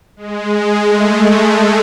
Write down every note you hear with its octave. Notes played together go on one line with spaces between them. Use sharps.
G#3
A3